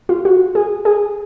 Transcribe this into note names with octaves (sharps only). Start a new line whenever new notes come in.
F4
F#4
G#4
G#4